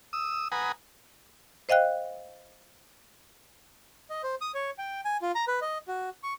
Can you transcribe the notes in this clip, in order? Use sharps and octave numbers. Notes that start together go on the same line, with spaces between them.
D#6 E6
B4 F#5 G#5 A#5 D#6
C5 D#5 F5 G5 F#6
D#5
C5
D#6
C#5
G5
G#5
F4
A#5
B4
D#5
F#4
C#6